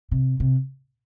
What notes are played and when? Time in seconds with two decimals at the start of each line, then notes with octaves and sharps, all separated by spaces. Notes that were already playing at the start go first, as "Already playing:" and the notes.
0.11 C3
0.40 C3